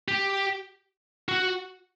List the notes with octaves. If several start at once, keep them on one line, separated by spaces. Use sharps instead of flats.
G4
F#4